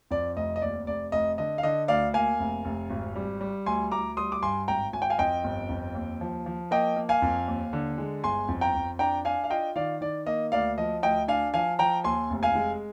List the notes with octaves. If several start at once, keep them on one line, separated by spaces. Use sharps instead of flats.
F2 D5
F1 D#5
D#5
D#2 D5
F1 D5
F1 D#5
D3 D#5
F5
D3 D#5
D2 D5 F5
A#3 F5 G#5
F1
F1
G#1
G3
G3
D2 G#5 C6
D2 A#5 D6
G3 C6 D#6
D6
G2 G#5 C6
G#1 G5 A#5
G#1 G#5
G5
F5 G#5
F2 D#5 G5
G1
F2
D#2
F3
F3
A#3 D#5 G5
A#3
F5 G#5
F2
D#2
D3
G#3
G1 G#5 C6
F2
G5 A#5
F2
D4 G5 A#5
D4 F5 G#5
F5
F4 D#5 G5
D#3 D5 F5
D#3 D5
A#3 D#5
D2 D5 F5
F3 D#5
D2 D#5 G5
D4 F5 G#5
F3 F5 G#5
F3 G5 A#5
D#2 G#5 C6
F1
F5 G#5
G#3